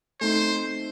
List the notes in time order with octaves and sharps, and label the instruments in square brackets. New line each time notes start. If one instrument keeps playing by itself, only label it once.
[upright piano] A3 C4 D#4 [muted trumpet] C5